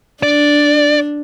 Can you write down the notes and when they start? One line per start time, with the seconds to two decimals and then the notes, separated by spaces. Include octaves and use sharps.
0.23 D4 D5